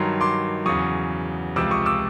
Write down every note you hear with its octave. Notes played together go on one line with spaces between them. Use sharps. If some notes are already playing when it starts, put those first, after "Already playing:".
Already playing: G2 D#3 F#3 A#5 C6
C6 D6
E2 C#3 F#3 C#6 D#6
C#2 C3 F3 D6 E6
C#6 D#6
D6 E6